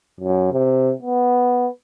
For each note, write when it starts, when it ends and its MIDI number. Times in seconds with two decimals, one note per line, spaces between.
0.20 0.47 42
0.52 0.92 48
1.02 1.67 59